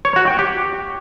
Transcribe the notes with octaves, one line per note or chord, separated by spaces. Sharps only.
C#5
F#4
G5
G4